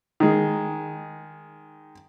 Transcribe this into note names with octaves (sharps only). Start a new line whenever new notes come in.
D#3 G#3